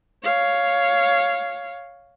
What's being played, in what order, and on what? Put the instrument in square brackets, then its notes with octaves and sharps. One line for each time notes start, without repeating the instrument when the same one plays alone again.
[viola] C#5 F5